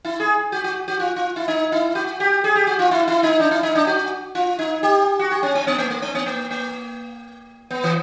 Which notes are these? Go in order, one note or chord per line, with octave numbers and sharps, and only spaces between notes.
E4
G#4
F#4
F#4
F#4
F4
F4
E4
D#4
E4
F#4
G4
G#4
G4
F#4
F4
E4
E4
D#4
D4
E4
D#4
D4
F#4
F4
D#4
G4
F#4
G4
C#4
C4
B3
A#3
A3
C4
B3
A#3
A#3
B3
E3